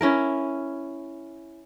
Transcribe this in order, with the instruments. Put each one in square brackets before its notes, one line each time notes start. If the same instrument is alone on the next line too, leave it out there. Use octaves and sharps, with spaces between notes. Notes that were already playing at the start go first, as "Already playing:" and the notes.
[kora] C#4 E4 A#4